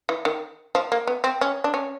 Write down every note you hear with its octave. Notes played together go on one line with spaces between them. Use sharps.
E3
D#3
F3
A#3
B3
C4
C#4
D4
C#4